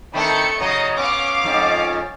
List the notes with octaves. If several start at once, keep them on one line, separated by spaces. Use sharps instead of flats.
D#3 A3 C4 D4 A4 G5 B5 C#7
C#3 F#3 D#4 D#5
B3 C#4 F5 D6
F2 G#2 F3